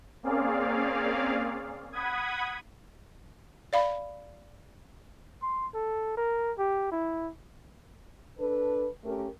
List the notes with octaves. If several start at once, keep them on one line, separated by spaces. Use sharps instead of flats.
A#3 C4 C#4 G#4 D5 F5
F#5 B5 D#6 G#6
D5 F5 B5
C6
A4
A#4
G4
E4
D4 A4 B4
A3 C#4 G4 A#4